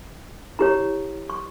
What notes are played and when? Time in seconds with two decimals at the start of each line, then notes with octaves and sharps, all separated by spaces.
0.59 E4 G4 C#5 A#5
1.30 C#6